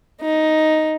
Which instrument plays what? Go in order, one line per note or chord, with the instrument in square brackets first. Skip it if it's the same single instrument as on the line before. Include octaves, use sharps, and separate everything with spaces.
[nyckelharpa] D#4